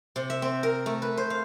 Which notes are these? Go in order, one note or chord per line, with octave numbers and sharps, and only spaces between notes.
C3
E5
C4
A#4
A3
B4
C5
F5